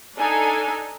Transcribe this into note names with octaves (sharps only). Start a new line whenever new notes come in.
D4 D#4 A4 G#5